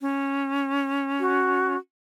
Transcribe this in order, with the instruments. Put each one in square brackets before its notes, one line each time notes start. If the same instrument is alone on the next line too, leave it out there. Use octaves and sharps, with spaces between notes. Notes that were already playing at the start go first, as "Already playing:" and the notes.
[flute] C#4
[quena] F#4